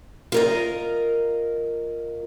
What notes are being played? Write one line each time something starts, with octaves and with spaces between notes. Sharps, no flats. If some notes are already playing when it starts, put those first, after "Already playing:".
F4 A#4 D#5